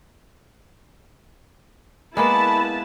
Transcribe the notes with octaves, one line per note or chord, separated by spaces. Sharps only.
G#3 A#3 B3 E4 B4 A5 B5